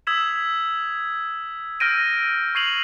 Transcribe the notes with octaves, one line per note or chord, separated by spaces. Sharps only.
D#6 E6 G#6 B6 E7
E6 F6 G6 A#6 D7 D#7
C#6 G#6 C7 D#7 F7 F#7